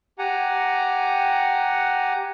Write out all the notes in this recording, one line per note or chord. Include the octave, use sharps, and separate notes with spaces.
G4 F#5 G#5 A#5